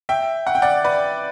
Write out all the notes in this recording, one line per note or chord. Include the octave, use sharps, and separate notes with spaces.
E5 G5
F#5
G5
D5 F#5
B4 D5